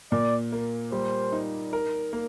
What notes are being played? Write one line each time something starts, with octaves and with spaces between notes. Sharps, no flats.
A#2 D5
A#3
G3 C5
D#4
A#4
A#3